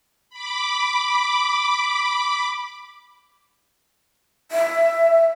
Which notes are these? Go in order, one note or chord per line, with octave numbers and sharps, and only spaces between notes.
B5 D6
E5